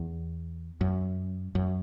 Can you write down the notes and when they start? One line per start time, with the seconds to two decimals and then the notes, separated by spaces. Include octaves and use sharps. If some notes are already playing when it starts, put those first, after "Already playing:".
Already playing: E2
0.81 F#2
1.55 F#2